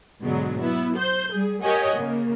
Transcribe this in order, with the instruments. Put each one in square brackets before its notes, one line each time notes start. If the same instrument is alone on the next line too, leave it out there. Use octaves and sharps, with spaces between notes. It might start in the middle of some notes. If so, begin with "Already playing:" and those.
[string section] G#2 B2 D3 F#3 G#3
F#3 B3 E4
C5 G6
G3 G#4
G4 A#4 C#5 D#5 F#5 G#5
C#3 A#3